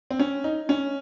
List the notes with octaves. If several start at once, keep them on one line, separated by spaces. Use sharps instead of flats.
C4
C#4
D#4
C#4